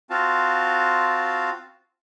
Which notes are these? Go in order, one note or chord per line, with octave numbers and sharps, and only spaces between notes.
C4 F4 F#4 F5 A5